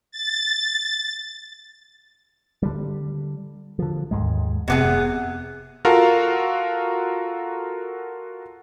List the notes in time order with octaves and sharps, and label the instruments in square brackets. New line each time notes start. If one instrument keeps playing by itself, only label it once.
[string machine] A6
[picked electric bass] D3 G3
D3 F3
D#2 G#2 G#3
[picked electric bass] F1 [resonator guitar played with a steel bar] C3 B3 G#4
[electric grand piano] F4 F#4 A4 A#4 F5